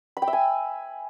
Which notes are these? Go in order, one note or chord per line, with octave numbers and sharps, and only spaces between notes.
B5
G5
E5
G#5